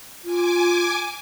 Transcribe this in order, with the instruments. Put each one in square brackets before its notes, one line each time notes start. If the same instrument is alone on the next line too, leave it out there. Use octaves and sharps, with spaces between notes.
[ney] F4 [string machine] G#5 D6